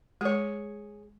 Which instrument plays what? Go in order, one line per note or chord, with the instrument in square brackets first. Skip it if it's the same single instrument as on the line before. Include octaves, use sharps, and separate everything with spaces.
[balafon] G#3 [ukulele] G#4 C#5